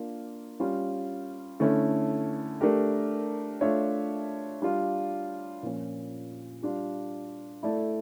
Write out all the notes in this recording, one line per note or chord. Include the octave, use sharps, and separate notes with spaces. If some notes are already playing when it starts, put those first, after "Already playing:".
Already playing: A#3 D4 F4
G3 C#4 F4
D3 A3 C#4 E4
A3 D4 G4 A#4
A3 D4 F4 C#5 E5
G3 D4 F4
A#2 F3 C#4
G3 D4 F4
A3 E4 A4 D5